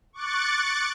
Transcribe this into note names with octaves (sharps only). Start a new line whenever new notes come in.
C#6 D6 F#6 A6 C#7